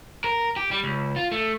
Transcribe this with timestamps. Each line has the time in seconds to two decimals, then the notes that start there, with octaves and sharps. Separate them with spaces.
0.24 A#4
0.56 G4
0.71 G3
0.84 C#2
1.16 F4
1.32 A3